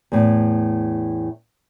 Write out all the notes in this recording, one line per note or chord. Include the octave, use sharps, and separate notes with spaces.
E2 A2